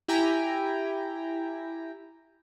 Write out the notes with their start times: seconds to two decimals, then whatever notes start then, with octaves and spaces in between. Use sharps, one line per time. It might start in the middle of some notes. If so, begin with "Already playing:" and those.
0.08 E4 G4 G5 G#5 A#5